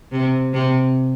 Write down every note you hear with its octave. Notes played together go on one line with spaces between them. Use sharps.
C3
C3